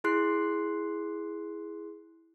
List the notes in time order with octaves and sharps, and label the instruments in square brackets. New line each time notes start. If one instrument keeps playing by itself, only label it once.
[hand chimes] E4 G#4 C6 F#6 C7